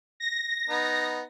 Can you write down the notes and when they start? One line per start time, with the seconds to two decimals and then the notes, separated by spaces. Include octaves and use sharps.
0.20 A#6
0.69 B3 D#4